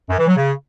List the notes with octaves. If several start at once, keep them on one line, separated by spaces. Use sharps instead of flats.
F#2
E3
F#3
C#3